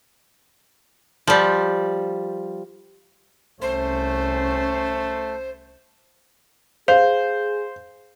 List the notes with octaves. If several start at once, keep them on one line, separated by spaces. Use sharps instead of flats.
F3 G3
C2 A3 C#4 C5
G#4 C5 F5